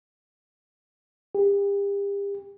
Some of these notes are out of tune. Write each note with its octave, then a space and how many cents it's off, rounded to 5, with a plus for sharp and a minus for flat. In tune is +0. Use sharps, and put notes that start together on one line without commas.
G4 +35